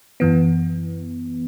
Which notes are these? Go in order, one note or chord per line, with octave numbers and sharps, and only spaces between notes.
F#2 E3 B3